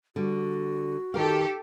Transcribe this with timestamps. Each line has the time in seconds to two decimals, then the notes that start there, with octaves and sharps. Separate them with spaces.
0.16 D3 G3 F#4
1.14 D#3 G4 A4 A#4 F5